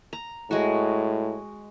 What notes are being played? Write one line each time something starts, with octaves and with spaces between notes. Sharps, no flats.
A#5
A2 G#3 F#4